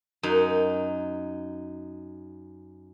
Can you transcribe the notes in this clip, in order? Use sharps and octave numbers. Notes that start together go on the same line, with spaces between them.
F#2 D#4